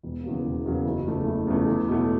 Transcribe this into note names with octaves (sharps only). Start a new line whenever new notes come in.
E1
E2 C#3 F#3 A#3
E1
E2 C#3 F#3 A#3
F#1
E2 C#3 F3 A3
F#1
E2 C#3 F3 A3
E2
B2 F#3 A3